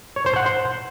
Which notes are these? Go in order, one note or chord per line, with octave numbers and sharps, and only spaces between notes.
C#5
C5
F#5
C5